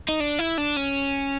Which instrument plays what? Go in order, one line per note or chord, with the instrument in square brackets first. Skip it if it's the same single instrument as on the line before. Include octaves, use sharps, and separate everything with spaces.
[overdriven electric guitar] D#4
D4
E4
D4
C#4